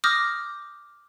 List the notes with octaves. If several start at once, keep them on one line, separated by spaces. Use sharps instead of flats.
D6 D#6 F6 G6 A#6